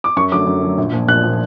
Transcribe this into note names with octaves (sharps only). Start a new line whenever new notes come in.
D6
F#2 C#6
D3 F#3 A3 D6
F#2
D3 F#3 A3
A#1
A#2 F3
A#1 F#6
A#2 F3